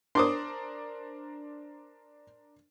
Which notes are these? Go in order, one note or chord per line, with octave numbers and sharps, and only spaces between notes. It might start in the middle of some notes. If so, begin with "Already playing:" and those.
D4 A#4 C5 C6 D6 D#6